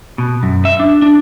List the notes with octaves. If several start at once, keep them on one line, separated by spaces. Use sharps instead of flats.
B2
F#2
E5
D4
D4